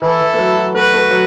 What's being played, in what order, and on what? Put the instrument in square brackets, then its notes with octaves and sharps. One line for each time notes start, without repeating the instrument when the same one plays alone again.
[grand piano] E3 [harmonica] E4 A4
[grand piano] E3
A3
F#3
F#3
[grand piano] A3 [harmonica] F#4 B4
[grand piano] A3
F#3